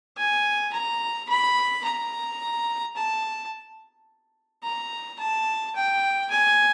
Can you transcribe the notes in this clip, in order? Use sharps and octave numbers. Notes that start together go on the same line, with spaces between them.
G#5
A#5
B5
A#5
A5
A#5
A5
G5
G#5